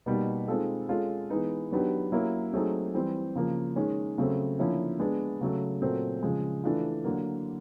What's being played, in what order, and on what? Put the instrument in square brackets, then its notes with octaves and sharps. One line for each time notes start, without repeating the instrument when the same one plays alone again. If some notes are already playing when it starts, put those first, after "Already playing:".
[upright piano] B2 G3 A#3 D#4
D#3 G#3 C4 F4 A4
G#3 C#4 F4 A4
E3 G#3 B3 D#4
D#3 F#3 B3 D4 G4
F#3 A#3 C#4 E4
F#3 A3 C4 D#4 G#4
E3 G3 C4
C#3 F3 A#3
D#3 G#3 C#4
C#3 F#3 A3 C4
D3 F3 A#3 C#4 E4
G#3 B3 D4
C#3 F#3 A3
A#2 F#3 A3 C4
C#3 F3 G#3
E3 A3 D4 F4
D3 F#3 A#3